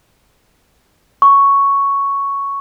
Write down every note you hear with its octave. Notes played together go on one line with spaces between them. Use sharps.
C#6